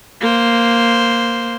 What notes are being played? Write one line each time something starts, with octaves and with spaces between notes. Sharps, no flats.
A#3 C5